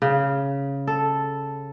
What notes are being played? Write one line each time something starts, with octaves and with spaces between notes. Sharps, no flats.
C#3
A4